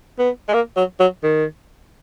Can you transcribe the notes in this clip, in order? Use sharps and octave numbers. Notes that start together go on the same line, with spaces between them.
B3
G#3
A#3
F#3
F#3
D#3